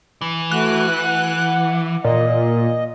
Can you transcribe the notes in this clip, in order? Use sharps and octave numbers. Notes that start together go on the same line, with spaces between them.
E3
A3 F#4 F#6
F#5
A#2 D#5